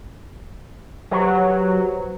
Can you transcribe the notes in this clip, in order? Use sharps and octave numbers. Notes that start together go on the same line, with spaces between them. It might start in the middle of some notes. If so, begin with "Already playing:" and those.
F#3 G4 B4 C5